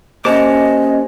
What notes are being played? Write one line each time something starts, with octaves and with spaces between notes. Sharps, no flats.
A#3 C#4 G4 C5 D#5 A5 D6